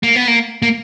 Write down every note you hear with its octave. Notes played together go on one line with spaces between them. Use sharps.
A#3
B3
A#3
A#3